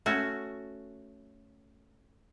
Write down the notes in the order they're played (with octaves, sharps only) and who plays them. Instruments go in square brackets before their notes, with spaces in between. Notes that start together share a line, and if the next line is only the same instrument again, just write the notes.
[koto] A3 C#4 F#4